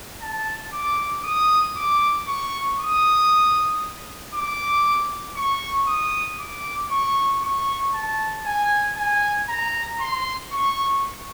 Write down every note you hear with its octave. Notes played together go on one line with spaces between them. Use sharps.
A5
D6
D#6
D6
C#6
D#6
D6
C#6
D#6
D6
C#6
C#6
A5
G#5
G#5
A#5
C6
C#6